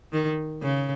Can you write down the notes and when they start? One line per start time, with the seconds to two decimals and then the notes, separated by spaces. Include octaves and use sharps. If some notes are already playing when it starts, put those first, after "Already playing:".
0.13 D#3
0.62 C#3